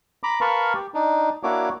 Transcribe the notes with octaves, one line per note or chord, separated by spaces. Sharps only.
A#5 B5 D6
A#4 B4 F5 A5 B5 C#6
G4
D4 D#4
A#3 D4 E4 F#4 C#5 D6